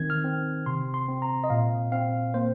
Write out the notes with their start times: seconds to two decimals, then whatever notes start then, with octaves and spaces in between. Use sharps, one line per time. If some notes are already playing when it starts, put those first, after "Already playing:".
Already playing: D#3 C4 G#6
0.10 F6
0.24 C4
0.66 C3 C6
0.94 C6
1.08 C4
1.22 A#5
1.44 D#5
1.50 A#2 F5
1.92 C4 F5
2.34 A#3 C5